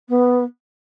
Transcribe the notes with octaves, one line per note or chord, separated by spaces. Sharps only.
B3